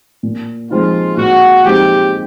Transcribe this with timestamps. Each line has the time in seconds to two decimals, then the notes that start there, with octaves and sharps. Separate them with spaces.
0.23 A#2
0.71 F3 G#3 C4 D#4 F4
1.17 A#2 F#4
1.65 F3 G#3 C4 D#4 G4